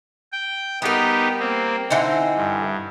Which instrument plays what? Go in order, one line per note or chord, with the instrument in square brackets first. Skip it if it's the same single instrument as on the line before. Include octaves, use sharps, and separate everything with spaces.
[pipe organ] G5
[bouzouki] G3 A#4 [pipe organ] B3 D#4 G4
[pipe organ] A#3 C4
[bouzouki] D3 E3 D#4 [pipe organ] C4
[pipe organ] G2